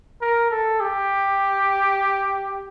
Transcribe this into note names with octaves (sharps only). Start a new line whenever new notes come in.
A#4
A4
G4